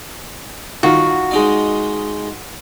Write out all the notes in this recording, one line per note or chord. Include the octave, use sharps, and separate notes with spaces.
D#3 F4 F#4
G#3 D#4 D5